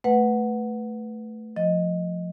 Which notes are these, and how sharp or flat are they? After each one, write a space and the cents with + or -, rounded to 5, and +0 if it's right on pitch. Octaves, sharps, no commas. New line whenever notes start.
A3 +0 B4 +0 F#5 -5
F3 +15 D#5 +0